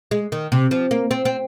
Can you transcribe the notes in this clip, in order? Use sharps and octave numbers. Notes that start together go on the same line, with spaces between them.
G#3
D#3
C3
F3
A#3
C4
C4